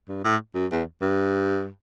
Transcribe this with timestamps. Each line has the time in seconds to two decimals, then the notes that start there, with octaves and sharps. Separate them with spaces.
0.08 G2
0.24 A2
0.55 F#2
0.71 E2
1.02 G2